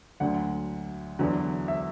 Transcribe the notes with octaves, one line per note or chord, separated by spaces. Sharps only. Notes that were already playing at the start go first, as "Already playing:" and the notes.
D2 D3 F#3 F#5
E2 D3 F#3
E5